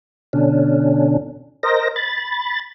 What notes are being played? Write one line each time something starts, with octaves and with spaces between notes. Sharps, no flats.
B2 D3 C#4 D4
A#4 C5 D#5 A#6
B5 A6